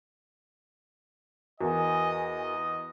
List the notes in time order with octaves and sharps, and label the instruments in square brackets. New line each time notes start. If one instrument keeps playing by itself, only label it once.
[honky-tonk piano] E2 [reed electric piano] F#4 A#4 [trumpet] D#5 [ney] G#5